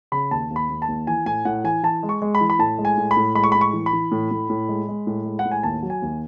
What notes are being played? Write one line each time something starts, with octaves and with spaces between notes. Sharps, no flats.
C#3 B5
D#2 A5
D#2
B5
D#2
A5
D#2
E3 G#5
A2 G#5
A2 F#5
E3 G#5
E3 A5
G#3
C#6
G#3
B5
E3
B5
A2 A5
G#3
G#5
A2
B5
A2
G#3 B5
C#6
A2 B5
C#6
E3
B5
E3
A2
A2
A2
G#3
G#3
A2
G#3
F#5
A2
G#5
D#2 A5
F#3
G#5
D#2